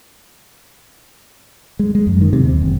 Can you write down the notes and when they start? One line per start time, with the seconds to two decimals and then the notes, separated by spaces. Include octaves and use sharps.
1.79 G#3
1.95 G#3
2.07 F#2
2.21 D#3
2.33 C3
2.44 D#2
2.61 F#1